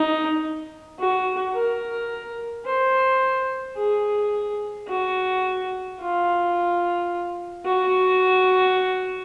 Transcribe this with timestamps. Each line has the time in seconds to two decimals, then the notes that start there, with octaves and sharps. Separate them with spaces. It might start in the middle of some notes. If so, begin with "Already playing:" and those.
Already playing: D#4
0.99 F#4
1.55 A#4
2.66 C5
3.77 G#4
4.88 F#4
6.00 F4
7.66 F#4